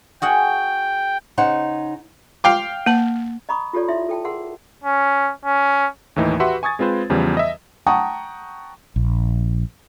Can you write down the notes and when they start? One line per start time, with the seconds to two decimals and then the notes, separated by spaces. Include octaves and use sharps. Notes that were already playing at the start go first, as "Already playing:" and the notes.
0.22 F#4 G#4 F#5 G5
1.37 C#3 D#4 C5 F#5
2.44 F5 G5 D6
2.86 A#3 A5
3.49 D#5 A#5 B5 C#6 D#6
3.73 F4 G4 A4 C#5 D5
3.88 E4 E5 C6
4.09 A4 G5 A5
4.24 G#4 A#4 F#5 C6
4.83 C#4
5.45 C#4
6.16 D#2 A2 E3 D#4
6.40 F#4 G4 B4 E5 F#5 C6
6.63 G#5 C#6 D#6 G#6 A6
6.79 G#3 C4 F4 B4 C5
7.10 E2 C#3 E3 F3 G3
7.37 D#5 E5
7.86 F#5 G5 A5 A#5 C#6 D#6
8.96 A#1